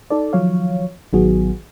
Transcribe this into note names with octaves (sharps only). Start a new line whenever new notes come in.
D#4 A4 D5
D#3 F3 F#3 C#5 F5
A1 D#3 F#3 B3 F#4 G#4